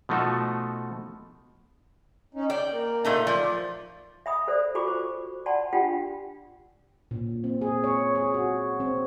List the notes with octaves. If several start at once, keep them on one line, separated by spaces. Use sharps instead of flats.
B2 F3 A3 D#4 F#4 A4
C#4 D#4
D5 G5
A#3
A#2 A3 D#4
F3 D5
E5 B5 D#6
A4 C5 D5
F4 F#4 A4 B5 C#6 D6
C5
D5 F#5 A5 B5 C6
D4 F4 G4 F#5 G5 B5
A#2
C4
G#4
C#5
G#4
F#4
C4